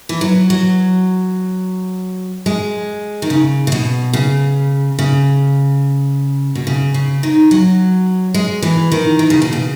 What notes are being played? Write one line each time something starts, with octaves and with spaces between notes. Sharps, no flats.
E3
F#3
F#3
G#3
D#3
C#3
C#3
B2
C#3
C#3
B2
C#3
C#3
D#3
F#3
G#3
E3
D#3
D#3
C#3
B2
C#3